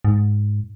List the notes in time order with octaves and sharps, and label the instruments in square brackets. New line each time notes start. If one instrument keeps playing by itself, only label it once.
[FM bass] G#2